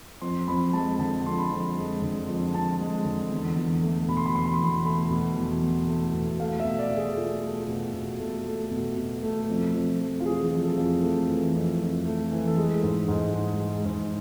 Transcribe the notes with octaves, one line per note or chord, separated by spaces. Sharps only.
F2 C6
F2 B5
G#3 A5
D3 A5
F2 C6
B5
F2
G#3
D3
F2
F2 A5
G#3
D3
E2
E2
A3
B2 B5
C6
B5
E2 C6
B5
C6
E2 B5
A3 B5
B2
E2
E2
A3
B2
A3 F5
E5
B2
D5
B2
G#4
A3 F4
A3
B2
B2
A3
A3
B2
B2
A3
F2
F2
A3
F4
E3 G#4
G#4
F2
G#4
A4
F2 F4
G#4
A3
E3
F2
F2
A3
E3
A4
G#3 G#4
G#2
G#2
G#3
G#3
G#2